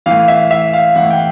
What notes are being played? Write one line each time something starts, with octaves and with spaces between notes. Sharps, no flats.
A2 E3 F5
E5
E5
F5
A2 E3 F#5
G5